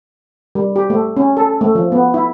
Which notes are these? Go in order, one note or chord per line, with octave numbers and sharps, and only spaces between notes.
G3
G4
A3
C#4
A4
A3
F3
B3
E4